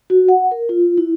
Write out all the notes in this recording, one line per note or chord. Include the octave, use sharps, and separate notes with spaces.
F#4
F#5
A#4
F4
E4